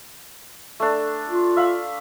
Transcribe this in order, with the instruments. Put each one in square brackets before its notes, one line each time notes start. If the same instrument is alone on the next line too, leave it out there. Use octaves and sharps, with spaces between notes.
[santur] A3 D4
[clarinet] F4
[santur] E5 F5 B5